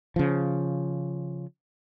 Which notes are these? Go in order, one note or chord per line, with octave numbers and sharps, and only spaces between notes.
C#3 F3